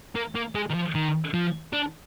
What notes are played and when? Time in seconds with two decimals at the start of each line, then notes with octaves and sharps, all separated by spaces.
0.15 A#3
0.35 A#3
0.55 G#3
0.70 D#3
0.74 F3
0.95 D#3
1.34 F3
1.73 D4